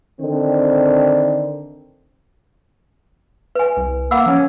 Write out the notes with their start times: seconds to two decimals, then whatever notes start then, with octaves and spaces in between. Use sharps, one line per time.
0.20 D3 D#3 C4
3.55 B4 G#5
3.77 C2
4.11 A#3 F#5 B5 E6
4.26 F3 C#4